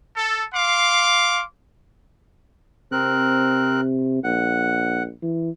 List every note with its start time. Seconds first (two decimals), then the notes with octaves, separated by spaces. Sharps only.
0.16 A4
0.54 F5 C6 D6
2.92 C3 C4 A#4 F#6
4.24 A#1 F#5
5.22 E3